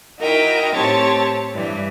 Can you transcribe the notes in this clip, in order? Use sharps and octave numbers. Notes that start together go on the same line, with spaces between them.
D#4 E4 F#4 A#4 D#5 G5
A2 C4 G4 C#5 A5 A6
G2 E3 G3